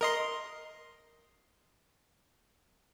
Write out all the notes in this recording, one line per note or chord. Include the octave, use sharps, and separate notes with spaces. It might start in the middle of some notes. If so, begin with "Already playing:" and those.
A#4 D#5 C6